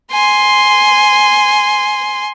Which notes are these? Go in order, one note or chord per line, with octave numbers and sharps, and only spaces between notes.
G#5 C6